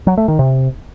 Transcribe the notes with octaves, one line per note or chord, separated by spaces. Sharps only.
F#3
A3
D#3
C3